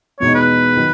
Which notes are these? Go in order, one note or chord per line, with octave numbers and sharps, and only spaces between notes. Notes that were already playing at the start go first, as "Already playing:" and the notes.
E2 B2 G#3 D#4 C#5
B4
D#3 F#3